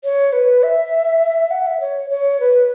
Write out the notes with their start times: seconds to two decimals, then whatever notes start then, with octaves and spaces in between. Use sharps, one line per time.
0.04 C#5
0.33 B4
0.63 E5
1.51 F#5
1.67 E5
1.80 C#5
2.10 C#5
2.40 B4